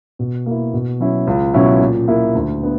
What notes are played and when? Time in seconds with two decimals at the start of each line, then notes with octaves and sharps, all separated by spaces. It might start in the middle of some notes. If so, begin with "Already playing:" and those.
0.19 B2
0.46 A#3 E4
0.74 B2
1.00 F#3 C#4 E4
1.27 C#2
1.54 B2 F#3 C#4 E4
1.80 A#2
2.08 A#3 E4
2.35 D2
2.62 B3 D4